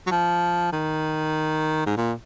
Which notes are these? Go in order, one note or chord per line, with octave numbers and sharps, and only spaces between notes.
F#3
F3
D#3
G#2
A#2